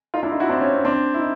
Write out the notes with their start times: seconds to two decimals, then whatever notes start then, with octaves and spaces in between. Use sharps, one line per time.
0.14 D#4 F4
0.23 D4 E4
0.32 D#4 F4
0.40 E4 F#4
0.49 C4 D4
0.61 C#4
0.73 C4
0.85 C4 D4
1.14 E4
1.20 D#4